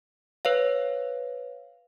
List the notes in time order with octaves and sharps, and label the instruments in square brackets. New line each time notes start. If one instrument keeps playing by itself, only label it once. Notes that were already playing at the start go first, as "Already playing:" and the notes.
[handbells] B4 C#5 F5